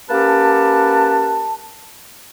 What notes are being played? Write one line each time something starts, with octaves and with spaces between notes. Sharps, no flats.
A#3 C#4 G4 B4 F#5 A5